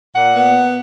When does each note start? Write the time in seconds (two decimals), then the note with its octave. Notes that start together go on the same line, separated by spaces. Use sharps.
0.15 A#2 F#5
0.35 B3